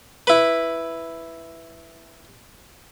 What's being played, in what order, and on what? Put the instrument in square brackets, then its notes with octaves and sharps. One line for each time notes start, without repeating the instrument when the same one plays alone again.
[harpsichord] E4 B4